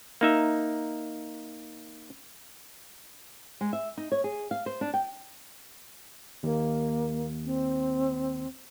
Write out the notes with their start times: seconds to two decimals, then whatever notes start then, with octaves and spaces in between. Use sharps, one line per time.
0.21 A#3 D#4 E5
3.61 G#3
3.73 E5
3.97 D#4
4.12 C#5
4.24 G#4
4.51 F5
4.66 C5
4.81 D4
4.94 G5
6.43 D#2 A#3
7.45 C4